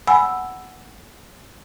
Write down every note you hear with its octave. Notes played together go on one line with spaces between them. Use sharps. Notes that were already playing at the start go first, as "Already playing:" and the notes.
F#5 G#5 B5 E6